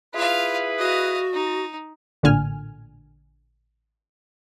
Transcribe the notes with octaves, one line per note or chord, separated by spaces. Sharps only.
E4 F4 G#4 B4 F5
F#4 D#5 F5
D#4
A1 A#2 D3 G#5 F6